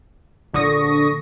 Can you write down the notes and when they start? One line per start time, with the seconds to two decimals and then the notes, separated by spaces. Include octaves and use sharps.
0.54 A#1 D3 C#6 D#6 A#6